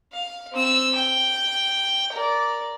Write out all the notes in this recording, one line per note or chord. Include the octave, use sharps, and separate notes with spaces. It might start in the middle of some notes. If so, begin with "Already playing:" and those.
F5
C4 E6
G5
A#4 D5